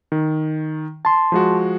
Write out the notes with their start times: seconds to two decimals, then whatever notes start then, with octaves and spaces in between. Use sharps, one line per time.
0.12 D#3
1.05 A5 C6
1.32 F3 G#3 F#4